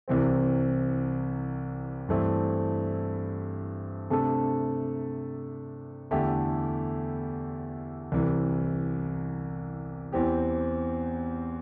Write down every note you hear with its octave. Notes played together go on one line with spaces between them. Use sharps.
C2 C3 E3 C4
G2 E3 A3 C4 E4
C3 A3 D4 A4
E2 D3 A3 E4 G4
C2 C3 E3
E2 E3 C4 G4